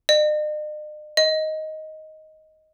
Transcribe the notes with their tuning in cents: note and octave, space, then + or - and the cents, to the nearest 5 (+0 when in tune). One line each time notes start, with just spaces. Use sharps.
D#5 -45
D#5 +10